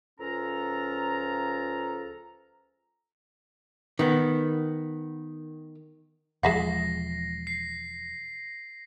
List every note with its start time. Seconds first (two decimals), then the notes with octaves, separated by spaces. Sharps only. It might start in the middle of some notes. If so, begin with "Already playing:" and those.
0.20 C#2 F3 C#4 A4 A#5
3.99 D#3 B3
6.43 E1 F3 G#3 G#4 E5 F#5 A#6 C7
7.47 C7